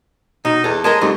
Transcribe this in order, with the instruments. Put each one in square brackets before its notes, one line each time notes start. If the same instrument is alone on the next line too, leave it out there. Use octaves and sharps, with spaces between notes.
[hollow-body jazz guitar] B2 [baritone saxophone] D#4
[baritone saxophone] E2 [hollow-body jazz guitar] A4
[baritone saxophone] G#3 [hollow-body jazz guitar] A#4 D#5 A5
[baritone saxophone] F2 [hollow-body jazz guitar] G3 A3 D#4